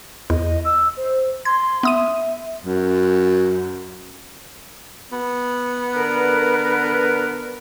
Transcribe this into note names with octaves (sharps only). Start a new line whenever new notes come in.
E2 D#5
E6
C5
C6 G#6
B3 E5 D#6 D#7
F#2
B3
D3 A#4 B4